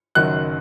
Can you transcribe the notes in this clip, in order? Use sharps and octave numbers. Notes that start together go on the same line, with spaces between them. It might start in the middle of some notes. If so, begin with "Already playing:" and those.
F#1 F#2 D#3 F#3 F#6